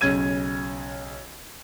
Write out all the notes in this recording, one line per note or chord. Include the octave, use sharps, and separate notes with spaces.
B1 C#3 G#6 D#7